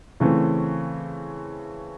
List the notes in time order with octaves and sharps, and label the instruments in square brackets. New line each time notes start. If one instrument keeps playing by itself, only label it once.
[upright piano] C#3 E3 A3 C4